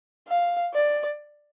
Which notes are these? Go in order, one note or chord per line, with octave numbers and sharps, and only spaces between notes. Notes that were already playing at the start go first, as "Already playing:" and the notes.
F5
D5